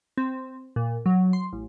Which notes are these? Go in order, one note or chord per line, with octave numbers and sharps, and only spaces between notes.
C4
A#2
F#3
C6
A1